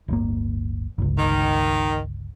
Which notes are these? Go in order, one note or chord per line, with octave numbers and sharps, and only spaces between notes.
D1 G1 A#3
G1 C#2
D#3